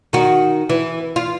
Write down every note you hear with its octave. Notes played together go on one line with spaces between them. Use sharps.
D#3 F#4
E3
F4